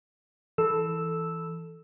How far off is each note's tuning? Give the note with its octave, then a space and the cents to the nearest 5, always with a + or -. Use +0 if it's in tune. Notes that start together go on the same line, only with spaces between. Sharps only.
E3 +0 A4 +0 E6 -5